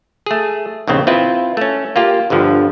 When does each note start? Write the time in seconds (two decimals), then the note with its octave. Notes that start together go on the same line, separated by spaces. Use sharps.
0.26 A3 G#4
0.88 A#1 D#2 C#3 C4
1.07 C4 E4 F4 B4
1.57 A3 C#4
1.96 A#3 F4 G4
2.30 G1 G2 D3 F3